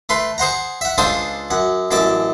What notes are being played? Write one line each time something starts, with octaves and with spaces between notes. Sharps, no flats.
A3 B4 C6
G#4 C5 F#5 A#5
E5 F#5
C#2 D4 F4 A4 C5 D#6
F#2 F#5
A1 F#2 A4 A5 D6